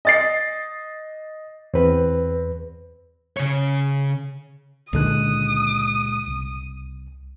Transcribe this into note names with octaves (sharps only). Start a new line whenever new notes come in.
D#5 A6 C7
E2 C4 B4
C#3 C#5
C#2 A#2 D3 D#3 G#3 D#6 F#6
C2